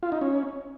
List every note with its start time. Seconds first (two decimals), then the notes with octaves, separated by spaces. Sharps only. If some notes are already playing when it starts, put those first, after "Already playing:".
0.03 F4
0.12 D#4
0.21 C#4